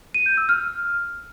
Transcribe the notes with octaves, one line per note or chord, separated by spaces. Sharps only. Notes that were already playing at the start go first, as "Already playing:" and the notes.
D#7
G6
E6
F6